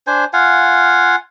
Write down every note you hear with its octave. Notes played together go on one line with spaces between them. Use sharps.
D4 C5 G#5
F4 F5 F#5 G#5